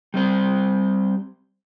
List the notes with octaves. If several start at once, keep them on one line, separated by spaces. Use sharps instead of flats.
G3 C4 C5